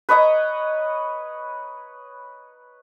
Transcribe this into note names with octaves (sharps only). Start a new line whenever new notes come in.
B4 C#5 D#5 A#5